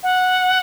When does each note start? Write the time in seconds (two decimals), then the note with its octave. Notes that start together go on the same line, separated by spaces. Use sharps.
0.03 F#5